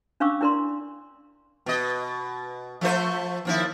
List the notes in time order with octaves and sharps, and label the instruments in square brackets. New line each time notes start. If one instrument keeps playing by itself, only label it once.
[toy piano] C#4 D4 F5 C#6 D6 E6
D4 E4 A#4 D5 C6
[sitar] B2 D#5
F3 A3 C5
D#2 F3 E4